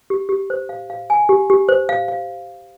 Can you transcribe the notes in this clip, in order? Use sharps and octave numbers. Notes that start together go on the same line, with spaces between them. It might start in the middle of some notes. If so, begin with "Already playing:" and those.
G4
G4
C5
F5
F5
G#5
G4
G4
C5
F5
F5